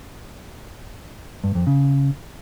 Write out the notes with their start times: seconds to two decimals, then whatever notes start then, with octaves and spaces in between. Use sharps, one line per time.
1.44 G2
1.55 F2
1.67 C#3